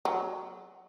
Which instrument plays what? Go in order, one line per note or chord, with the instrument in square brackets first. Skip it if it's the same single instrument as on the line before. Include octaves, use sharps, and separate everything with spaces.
[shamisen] F#3